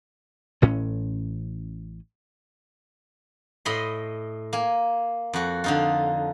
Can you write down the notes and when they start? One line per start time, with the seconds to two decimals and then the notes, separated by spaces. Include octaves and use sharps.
0.62 A1 A2 C#4
3.65 A2 D#5 B5 C6
4.53 A#3 G#5
5.33 F2 F#4
5.64 D3 D#4 F4